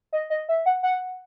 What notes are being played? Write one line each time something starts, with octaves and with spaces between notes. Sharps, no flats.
D#5
D#5
E5
F#5
F#5